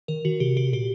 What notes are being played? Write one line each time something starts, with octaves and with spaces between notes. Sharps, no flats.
D#3 A#4
D#3 F#4
C3 G4
G4
A#2 G4